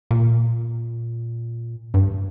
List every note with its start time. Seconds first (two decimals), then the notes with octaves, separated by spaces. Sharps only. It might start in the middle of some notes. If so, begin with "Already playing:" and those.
0.11 A#2
1.94 G2